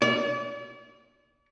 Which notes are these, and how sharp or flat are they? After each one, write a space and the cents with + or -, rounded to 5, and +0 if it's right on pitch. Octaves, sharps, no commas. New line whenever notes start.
D5 -40